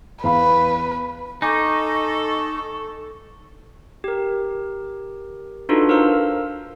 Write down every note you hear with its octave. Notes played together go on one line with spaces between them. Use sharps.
E2 B4 F5 B5
D#4 A4 G#5 C#6 D6 G6
G4 A#4
D4 D#4 F4 F#4 A4 B4
A#4 C5 F5 E6